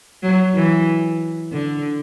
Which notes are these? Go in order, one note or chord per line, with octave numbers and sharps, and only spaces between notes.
F#3
E3
D3